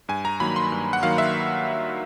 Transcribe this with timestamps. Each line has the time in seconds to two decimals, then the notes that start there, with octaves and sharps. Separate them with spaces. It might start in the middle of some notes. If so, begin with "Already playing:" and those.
0.09 G2 G#5
0.25 A#5
0.40 D#3 F#3 A#3 B5
0.56 C6
0.72 G2
0.93 F#5
1.03 D#3 F#3 A#3 F5
1.18 E5